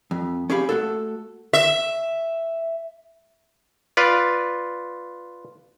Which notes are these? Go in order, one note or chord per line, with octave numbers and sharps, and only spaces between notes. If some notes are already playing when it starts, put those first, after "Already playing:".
F2
C#4 G4 G#4 F5 B5
A3 F#4 A4
E5
F4 B4 D5